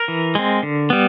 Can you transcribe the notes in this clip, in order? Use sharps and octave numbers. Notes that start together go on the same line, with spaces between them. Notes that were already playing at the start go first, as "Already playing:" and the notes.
Already playing: A#4
E3
G#3 C4
D3
G3 B3